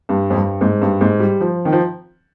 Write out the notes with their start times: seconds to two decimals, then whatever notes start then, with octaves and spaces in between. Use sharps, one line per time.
0.09 G2
0.30 F2
0.34 G2
0.61 G#2
0.82 G2
1.01 G#2
1.20 G3
1.41 F3
1.65 D#3
1.72 F3